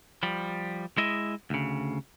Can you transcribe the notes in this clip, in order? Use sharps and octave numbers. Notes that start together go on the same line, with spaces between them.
F3 G3
G#3 E4 D#5 E5
D2 C#3